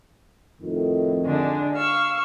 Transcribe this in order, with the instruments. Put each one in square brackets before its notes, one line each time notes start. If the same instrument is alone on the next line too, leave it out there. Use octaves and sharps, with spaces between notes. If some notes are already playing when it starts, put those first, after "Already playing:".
[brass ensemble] F2 A2 D#3
[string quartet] D3 G#3 D4
F5 C#6 E6